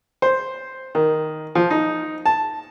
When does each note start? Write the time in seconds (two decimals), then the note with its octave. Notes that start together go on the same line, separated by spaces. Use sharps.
0.22 C5
0.95 D#3
1.55 F3
1.70 D#4
2.26 A5